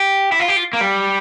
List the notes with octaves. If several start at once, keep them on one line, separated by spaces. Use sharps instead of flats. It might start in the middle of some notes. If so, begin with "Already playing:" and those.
Already playing: G4
E4
F4
G4
F4
A#3
G3